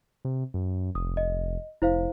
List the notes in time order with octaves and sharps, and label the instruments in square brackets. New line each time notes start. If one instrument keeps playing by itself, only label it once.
[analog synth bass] C3
F#2
[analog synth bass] F1 [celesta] D#6
[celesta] D#5
[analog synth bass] F1 [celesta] E4 C5 F5